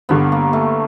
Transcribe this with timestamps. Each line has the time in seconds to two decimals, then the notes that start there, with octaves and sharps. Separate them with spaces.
0.09 G1 G2 D3 B3
0.32 A#3
0.53 A3